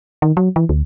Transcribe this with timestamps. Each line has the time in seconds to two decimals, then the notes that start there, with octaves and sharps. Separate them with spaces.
0.22 D#3
0.37 F#3
0.56 E3
0.69 D2